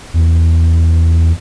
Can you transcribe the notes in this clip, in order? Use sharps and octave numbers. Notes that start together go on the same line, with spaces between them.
E2